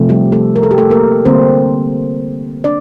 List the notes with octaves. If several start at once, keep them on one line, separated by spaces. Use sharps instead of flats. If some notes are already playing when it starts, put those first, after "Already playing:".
Already playing: C3 F3 A3
G3 G4
A3 A4
A#4
A4
G4
A3 A4
A#3 A#4
D3 G3 A#3 C4 C5
D4 D5